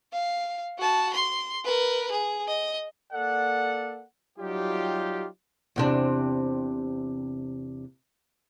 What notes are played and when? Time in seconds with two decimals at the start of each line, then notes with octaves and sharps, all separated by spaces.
0.12 F5
0.79 F#4 A5
1.13 C6
1.64 A#4 B4
2.12 G#4
2.48 D#5
3.13 A#3 A4 D5 F#5
4.39 F#3 G3 D#4 F4 G4
5.76 E2 C3 D4